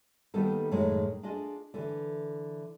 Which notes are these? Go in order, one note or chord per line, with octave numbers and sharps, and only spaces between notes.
D#3 G3 A#3 B3 D#4 A4
F#2 A2 D#3 G#3 C#5
D4 F4 G#4 D#5
D3 E3